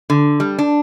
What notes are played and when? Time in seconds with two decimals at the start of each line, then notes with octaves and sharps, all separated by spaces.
0.10 D3
0.40 G3
0.59 D4